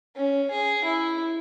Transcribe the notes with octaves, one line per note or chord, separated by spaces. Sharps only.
C#4
G#4
E4